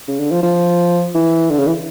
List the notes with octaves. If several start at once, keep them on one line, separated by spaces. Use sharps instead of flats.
C#3
D3
F3
F3
E3
D3
C#3
E3